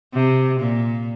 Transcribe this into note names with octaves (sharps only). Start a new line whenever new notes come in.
C3
A#2